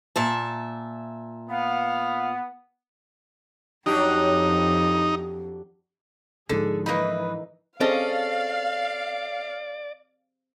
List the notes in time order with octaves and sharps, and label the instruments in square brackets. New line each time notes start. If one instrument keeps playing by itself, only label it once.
[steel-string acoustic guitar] A#2 E5 A5
[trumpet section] B3 [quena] F5
[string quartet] F2 [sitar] F#3 D4 G4 [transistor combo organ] D#4
[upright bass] G#2 F3 [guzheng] D3 [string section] G#4 [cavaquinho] A4
[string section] E3 [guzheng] A#3 D#4 [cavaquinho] B4 D#5 B5
[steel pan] C4 G#4 [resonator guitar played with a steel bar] C#4 A4 D#5 [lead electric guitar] D5 [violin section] F5